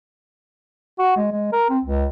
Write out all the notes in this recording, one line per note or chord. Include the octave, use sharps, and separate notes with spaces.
F#4
G#3
G#3
A#4
C4
C#2